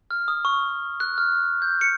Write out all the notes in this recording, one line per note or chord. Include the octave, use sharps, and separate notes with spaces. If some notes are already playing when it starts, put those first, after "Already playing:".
F6
D#6
C#6
F#6
F6
G6
C#7